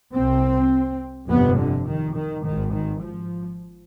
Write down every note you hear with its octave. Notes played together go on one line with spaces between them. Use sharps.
C2 C3 C4
G1 F2 C3 B3
D3
D#3
D#3
G#1 G#2 D#3
D#3
F3